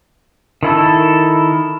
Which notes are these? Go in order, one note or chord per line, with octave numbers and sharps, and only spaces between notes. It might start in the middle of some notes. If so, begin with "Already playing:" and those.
D#3 E4 A4